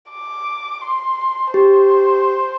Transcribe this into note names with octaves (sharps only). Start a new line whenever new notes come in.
D6
C6
G4 C5